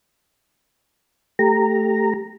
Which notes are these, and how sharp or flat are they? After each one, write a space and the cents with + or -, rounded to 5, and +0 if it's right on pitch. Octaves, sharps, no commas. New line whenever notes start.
A3 +0 G4 +0 A#5 -10